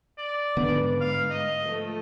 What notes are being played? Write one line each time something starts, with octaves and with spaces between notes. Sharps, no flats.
D5
G#2 D3 B3 D4 B4
F5
D#5
F3 A3